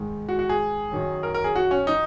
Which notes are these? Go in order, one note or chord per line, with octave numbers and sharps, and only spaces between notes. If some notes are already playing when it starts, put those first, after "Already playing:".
Already playing: G#2 D#3 G#3
F#4
F#4
G#4
F#2 D#3 F#3
A#4
A#4
G#4
F#4
C#4
D#4